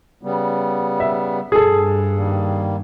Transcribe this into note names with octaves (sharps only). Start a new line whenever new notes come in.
C#3 G3 B3
E5
G2 G#4 A4
D#3 G3 A#3